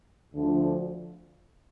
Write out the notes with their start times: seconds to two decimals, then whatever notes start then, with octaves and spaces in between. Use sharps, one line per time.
0.33 D2 D3 F3